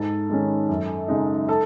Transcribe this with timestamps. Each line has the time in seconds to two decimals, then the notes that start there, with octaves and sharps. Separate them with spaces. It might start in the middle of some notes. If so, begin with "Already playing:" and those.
Already playing: G#2 A4 A5
0.30 D#3 G#3 C#4
0.69 F#2
1.08 C#3 G#3 D#4
1.49 A4 A5